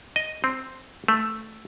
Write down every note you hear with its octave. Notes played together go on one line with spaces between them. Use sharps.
D#5
C4
A3